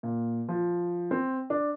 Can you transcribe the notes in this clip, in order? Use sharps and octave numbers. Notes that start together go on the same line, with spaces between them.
A#2
F3
C4
D4